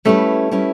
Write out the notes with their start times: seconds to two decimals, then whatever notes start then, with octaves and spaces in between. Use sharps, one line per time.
0.05 G3 A3 C#4 E4 B4
0.51 G3 C#4 E4 B4